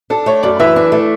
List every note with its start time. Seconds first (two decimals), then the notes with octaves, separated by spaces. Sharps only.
0.10 D4 A4
0.26 A3 C#5
0.43 F#2 D5
0.60 E3 E5
0.76 D4
0.92 A3